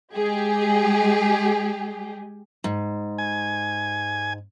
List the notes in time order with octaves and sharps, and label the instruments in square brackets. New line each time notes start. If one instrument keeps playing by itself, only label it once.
[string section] G#3 G4 G#4
[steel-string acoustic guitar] G#2
[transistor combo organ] G#5